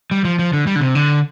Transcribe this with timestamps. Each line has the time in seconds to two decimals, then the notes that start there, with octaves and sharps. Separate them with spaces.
0.11 G3
0.25 F3
0.39 F3
0.53 D3
0.67 G3
0.76 D3
0.81 C3
0.95 D3